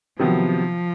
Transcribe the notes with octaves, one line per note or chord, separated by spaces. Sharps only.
C3 D#3 F3 F#3 B3